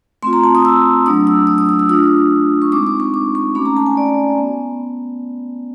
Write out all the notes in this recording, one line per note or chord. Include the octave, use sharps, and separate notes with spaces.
A3 C4 F4 C6
A#5
A5
D#6
E6
F#3 A3 D4 D#6
E6
D#6
D#6
D#6
E6
A3 D4 F4 D#6
C#6
G#3 C4 D#4 D6
D6
C#6
D6
C#6
A3 C#4 F#4 B5
A#5
A5
G#5
D5
B3